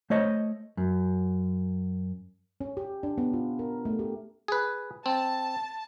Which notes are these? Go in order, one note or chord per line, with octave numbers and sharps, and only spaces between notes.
A3 C5 C#5 D#5
F#2
C#4
G4
D4
B3
F4
A#4
A3
G4
G#4 B4
C4 A5